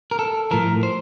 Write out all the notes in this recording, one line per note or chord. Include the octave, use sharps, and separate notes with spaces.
A#4
A4
A2 F3 A#4
C5